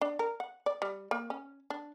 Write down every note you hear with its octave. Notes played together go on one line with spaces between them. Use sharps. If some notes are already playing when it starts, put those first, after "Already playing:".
D4
A#4
F#5
D5
G3
A#3
C#4
D4